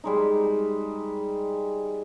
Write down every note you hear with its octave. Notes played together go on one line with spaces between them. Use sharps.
G3 G#3 D#4